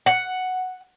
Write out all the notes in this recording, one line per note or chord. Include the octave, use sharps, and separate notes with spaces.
F#5